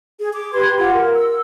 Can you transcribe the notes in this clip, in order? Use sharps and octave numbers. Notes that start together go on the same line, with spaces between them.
G#4
D6
G4 B4 C6 G#6
F4 G4 F#5
A#4
E6